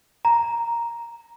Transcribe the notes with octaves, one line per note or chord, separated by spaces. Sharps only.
A#5